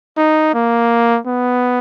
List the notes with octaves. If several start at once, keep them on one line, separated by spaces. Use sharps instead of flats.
D#4
A#3
B3